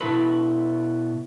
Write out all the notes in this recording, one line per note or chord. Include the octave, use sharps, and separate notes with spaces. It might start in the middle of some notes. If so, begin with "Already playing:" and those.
B2 E4 A4 B4